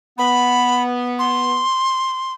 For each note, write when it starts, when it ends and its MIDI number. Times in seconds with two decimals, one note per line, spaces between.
0.18 1.61 59
0.18 0.83 83
1.19 2.33 84